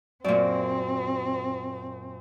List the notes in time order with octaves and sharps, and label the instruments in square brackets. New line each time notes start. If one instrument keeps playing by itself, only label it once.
[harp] F#2 A#2 [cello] C4 [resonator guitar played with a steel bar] D5